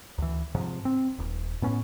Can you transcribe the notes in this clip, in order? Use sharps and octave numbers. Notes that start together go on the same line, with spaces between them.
D2 E3
G#2 C3 F3
C4
D#1
A2 B3 C#4